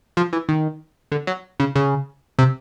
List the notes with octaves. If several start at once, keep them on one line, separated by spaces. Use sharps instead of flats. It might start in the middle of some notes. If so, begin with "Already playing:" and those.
F3
E3
D#3
D3
F#3
C#3
C#3
C3